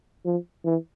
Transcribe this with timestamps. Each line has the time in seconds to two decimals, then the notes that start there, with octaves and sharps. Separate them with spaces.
0.25 F3
0.64 E3